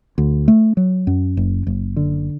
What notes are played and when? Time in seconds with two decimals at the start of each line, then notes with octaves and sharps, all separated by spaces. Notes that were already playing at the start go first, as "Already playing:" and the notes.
0.18 D2
0.48 A3
0.77 F#3
1.07 F#2
1.37 F#1
1.67 F#1
1.96 D3